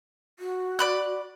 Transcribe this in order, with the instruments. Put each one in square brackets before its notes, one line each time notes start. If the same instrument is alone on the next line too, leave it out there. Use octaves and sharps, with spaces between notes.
[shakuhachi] F#4
[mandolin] D5 B5 F#6